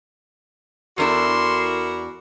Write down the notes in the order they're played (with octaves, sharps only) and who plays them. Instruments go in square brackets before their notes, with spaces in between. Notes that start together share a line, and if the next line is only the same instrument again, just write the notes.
[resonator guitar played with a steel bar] E2 D4 A4 [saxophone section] E4 F#4 A#4 [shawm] C6